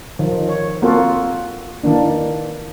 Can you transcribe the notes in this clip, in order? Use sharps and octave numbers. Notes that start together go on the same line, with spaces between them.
D#3 F3
C#5
A#3 C4 F4 F#4 A4
D#3 E3 A#3 D4